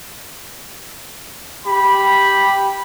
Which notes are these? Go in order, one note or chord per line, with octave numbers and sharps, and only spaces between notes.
G4 B5